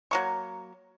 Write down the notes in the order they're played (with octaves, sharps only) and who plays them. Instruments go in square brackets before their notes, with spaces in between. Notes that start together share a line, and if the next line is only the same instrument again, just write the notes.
[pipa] F#3 A#3 C#6